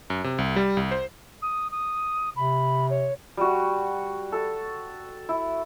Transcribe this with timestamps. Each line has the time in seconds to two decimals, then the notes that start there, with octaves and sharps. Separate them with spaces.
0.10 F#2
0.24 C3
0.38 C2
0.56 G3
0.77 C2
0.91 C5
1.42 D#6
1.71 D#6
2.36 C3 B5
2.90 C#5
3.37 G3 F#4
4.32 A4
5.29 E4